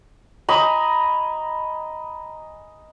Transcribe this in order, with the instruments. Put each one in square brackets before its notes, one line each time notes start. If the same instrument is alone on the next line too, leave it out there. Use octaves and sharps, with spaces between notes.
[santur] D#5 G#5 A#5 B5